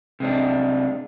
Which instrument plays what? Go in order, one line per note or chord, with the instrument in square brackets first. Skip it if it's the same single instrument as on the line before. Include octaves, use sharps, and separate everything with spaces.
[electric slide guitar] C3 G#3 D4